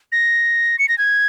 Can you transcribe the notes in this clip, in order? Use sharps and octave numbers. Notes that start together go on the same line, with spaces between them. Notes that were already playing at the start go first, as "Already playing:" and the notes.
A#6
C#7
A#6
G#6